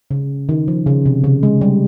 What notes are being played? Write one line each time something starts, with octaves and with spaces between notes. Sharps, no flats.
C#3
D#3
F3
C#3
C3
C#3
G#3
G3